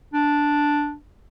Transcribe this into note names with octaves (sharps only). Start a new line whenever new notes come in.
D4